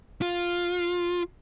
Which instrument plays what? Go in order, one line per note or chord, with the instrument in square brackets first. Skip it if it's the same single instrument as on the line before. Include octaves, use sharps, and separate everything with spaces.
[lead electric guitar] F4